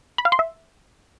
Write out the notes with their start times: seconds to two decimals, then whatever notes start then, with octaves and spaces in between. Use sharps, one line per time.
0.18 B5
0.25 F5
0.32 C6
0.39 E5